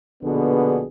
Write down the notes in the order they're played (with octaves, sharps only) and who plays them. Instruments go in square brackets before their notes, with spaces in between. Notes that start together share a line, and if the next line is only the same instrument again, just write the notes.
[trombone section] A#1 B2 D3 B3 D4 G#4